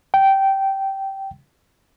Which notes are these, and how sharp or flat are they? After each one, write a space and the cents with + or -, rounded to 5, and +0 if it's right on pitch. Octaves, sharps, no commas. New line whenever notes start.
G5 -15